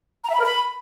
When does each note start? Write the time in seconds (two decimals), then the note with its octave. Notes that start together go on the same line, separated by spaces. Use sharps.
0.23 A#5
0.28 E5
0.33 B5
0.39 A#4
0.44 B5